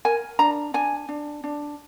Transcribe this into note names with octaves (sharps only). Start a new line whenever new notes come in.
A#4 G#5
D4 A#5
D4 G#5
D4
D4